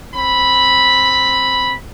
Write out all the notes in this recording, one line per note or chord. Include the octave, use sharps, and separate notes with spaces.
C4 B5